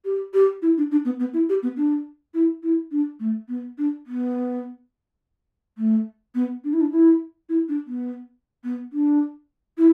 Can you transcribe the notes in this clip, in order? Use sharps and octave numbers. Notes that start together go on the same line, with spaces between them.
G4
G4
E4
D4
D4
B3
B3
E4
G4
B3
D4
E4
E4
D4
A3
B3
D4
B3
A3
B3
D4
E4
D4
E4
E4
D4
B3
B3
D4
E4